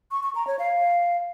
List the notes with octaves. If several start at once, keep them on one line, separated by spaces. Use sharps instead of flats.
C#6
C#6
A#5
C#5
F5